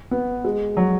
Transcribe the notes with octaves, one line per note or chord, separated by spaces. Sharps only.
B3
G#3
F#3